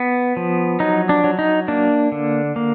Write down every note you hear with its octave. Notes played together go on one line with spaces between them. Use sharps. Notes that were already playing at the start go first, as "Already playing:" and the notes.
Already playing: B3
F3
F#3 D#4
D4
F#3
D#4
A#3 D4
D3
A#3